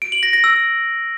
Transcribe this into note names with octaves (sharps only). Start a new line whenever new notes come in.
D7
F#7
A#6
A#6
E6